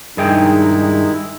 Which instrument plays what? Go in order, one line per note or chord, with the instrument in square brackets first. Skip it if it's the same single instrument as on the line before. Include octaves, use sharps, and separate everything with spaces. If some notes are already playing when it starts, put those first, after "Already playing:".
[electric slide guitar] G2 G#4 G5 [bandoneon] D#3 G#3 E4 [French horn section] D#4